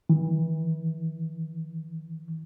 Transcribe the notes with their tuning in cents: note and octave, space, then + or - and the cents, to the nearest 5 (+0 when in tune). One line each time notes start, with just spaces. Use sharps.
E3 -30